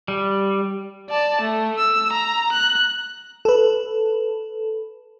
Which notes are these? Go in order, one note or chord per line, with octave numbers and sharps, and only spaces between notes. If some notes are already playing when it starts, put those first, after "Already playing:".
G3
D5 A5
A3
E6
A#5
F#6
A4 B4